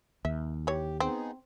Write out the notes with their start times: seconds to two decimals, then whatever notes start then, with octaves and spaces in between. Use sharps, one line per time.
0.25 D#2 E5
0.67 E3 G4 C#5
1.00 B3 C4 D#4 G#4